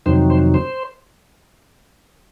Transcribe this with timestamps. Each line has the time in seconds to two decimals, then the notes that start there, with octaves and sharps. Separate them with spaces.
0.06 F2 C3 D#3 F#3 C5
0.30 C5
0.54 C5